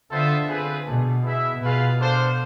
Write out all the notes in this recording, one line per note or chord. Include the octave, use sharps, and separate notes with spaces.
D3 B3 F4 A4 C5 E5
C4 F4 G#4 B4
B2 A3 D4 G#4
E4 G#4 B4 E5
B2 F4 G#4 B4 F5
D4 A4 C5 F5